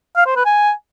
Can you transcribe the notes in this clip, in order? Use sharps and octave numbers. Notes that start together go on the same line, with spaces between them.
F5
C5
B4
G#5